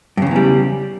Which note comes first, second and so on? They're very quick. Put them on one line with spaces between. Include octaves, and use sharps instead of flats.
G2 C#3 E2 E3 G3